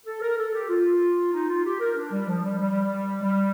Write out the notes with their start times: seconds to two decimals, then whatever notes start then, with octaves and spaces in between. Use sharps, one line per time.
0.07 A4
0.22 A#4
0.38 A4
0.54 G4
0.70 F4
1.33 D#4
1.49 F4
1.65 G4
1.81 A#4
1.96 D4
2.12 G3
2.28 F3
2.44 G3
2.60 G3
3.23 G3